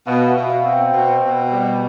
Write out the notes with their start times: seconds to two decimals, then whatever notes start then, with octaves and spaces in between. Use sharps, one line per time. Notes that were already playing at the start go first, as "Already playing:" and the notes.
0.07 B2 F5
0.28 E5
0.36 B2
0.50 F5
0.65 C4
0.73 G5
0.94 B2 G5
1.23 B2
1.52 G3